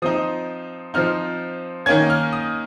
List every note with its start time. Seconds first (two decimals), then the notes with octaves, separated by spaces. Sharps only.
0.02 F3 C4 D#4 D#6
0.94 F3 C4 D#4 F6
1.86 D#3 A#3 C#4 G#6
2.10 F6
2.32 D#6